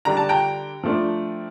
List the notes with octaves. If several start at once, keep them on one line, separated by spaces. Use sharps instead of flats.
D3 G3 D4 A#5
A5
G5 A#5
F3 A3 D4